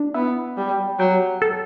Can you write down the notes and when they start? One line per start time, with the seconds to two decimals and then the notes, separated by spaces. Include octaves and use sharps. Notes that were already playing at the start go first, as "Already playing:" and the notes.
Already playing: D4
0.14 B3 E4
0.57 G3
0.99 F#3 G4
1.42 A4